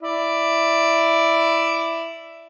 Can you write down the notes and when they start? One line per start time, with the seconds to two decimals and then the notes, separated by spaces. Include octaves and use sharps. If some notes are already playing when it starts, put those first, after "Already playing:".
0.03 E4 D5